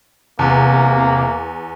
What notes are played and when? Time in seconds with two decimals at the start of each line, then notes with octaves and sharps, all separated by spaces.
0.39 E2 C3 A#3